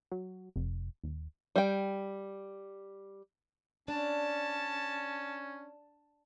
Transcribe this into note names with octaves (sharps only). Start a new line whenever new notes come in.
F#3
F1
D#1
G3 G5
C#4 D4 A5